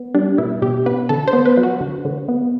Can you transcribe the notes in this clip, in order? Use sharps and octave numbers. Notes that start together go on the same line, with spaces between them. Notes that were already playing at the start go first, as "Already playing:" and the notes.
Already playing: B3
G3 D4
B2 E4
B2 G4
B3 B4
D3 A4
C5
B3
B4
F#3
F#4
D3
D3
B3